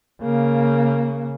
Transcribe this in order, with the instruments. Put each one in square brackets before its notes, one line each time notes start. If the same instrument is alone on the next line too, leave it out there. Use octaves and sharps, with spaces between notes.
[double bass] C#3 A#3